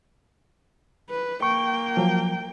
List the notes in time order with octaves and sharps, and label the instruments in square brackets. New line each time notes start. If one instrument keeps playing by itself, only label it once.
[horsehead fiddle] B4
[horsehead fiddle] A#3 G5 [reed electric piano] C#6
[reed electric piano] F3 F#3